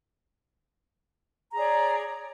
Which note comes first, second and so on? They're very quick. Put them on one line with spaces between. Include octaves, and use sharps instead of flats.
A#5 G#4 C#5 D5